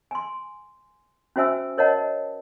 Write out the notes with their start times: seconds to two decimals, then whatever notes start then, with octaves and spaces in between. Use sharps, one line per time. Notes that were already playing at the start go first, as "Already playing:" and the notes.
0.11 G#5 C6
1.36 C#4 F#4 C5 E5 G#5 E6
1.78 A#4 C#5 D#5 F#5 A5